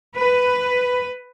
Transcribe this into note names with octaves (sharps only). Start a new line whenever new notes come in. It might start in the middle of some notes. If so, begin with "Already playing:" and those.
B4